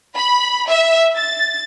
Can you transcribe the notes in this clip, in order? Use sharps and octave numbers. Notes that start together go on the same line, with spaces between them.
B5
E5
A6